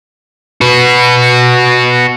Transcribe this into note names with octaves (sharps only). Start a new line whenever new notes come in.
F#4 B4